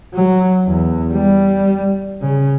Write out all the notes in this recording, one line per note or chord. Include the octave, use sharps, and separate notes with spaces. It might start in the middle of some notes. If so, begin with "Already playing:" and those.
F#3
E2
G3
C#3